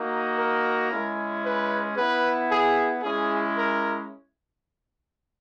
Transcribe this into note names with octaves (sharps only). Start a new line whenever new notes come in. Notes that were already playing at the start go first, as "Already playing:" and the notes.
Already playing: A#3 D#4 F#4
A#4
G#3 C#4 E4
B4
B3 E4 B4
G#4
G#3 C#4 E4 G#4
A#4